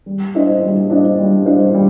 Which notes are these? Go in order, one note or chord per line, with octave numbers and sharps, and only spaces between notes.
G3
D4 F4 C5 D#5
G3
D4 F4 C5 D#5
G3
D4 F4 C5 D#5
G3